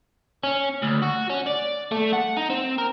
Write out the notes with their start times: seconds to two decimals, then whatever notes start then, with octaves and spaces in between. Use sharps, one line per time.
0.43 C#4
0.83 D2
1.03 F#4
1.30 C#4
1.46 D5
1.92 A3
2.13 F#5
2.37 D#4
2.50 C4
2.78 A#4